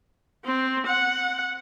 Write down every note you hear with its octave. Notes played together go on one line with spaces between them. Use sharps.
C4
F#5